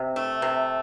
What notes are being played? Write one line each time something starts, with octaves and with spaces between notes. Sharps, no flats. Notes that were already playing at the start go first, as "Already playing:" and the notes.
Already playing: C3
A3
C3